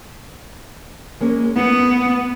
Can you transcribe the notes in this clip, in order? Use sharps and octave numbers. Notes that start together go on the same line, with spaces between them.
G#3 A#3 C#4
B3 E4